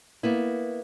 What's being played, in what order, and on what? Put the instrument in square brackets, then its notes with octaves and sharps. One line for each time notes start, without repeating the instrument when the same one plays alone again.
[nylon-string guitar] A#3 B3 E4